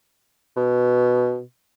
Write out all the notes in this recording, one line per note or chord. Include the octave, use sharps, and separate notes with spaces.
B2